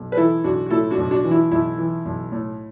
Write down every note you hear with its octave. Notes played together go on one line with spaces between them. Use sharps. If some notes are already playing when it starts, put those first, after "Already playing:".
Already playing: B1
B4
E3 E4 A4
B1 D4 F#4
F#4
A2 E4 A4
D4 F#4
B1
D4 F#4
E3
E4
B1 E4
E3
B1
A2